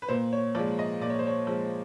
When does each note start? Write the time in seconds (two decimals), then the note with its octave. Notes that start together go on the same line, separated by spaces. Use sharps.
0.02 B4
0.08 A#2 C5
0.33 C#5
0.55 F3 D5
0.59 G#3
0.79 D#5
1.01 A#2 D5
1.10 C#5
1.19 C5
1.27 C#5
1.47 F3 G#3